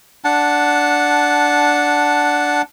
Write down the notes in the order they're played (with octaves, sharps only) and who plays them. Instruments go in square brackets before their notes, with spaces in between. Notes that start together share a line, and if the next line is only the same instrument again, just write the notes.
[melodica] D4 F#5 A5